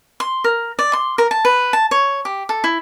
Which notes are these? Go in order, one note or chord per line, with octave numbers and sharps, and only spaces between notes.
C6
A#4
D5
C6
A#4
A5
B4
A5
C#5
G4
A4
E4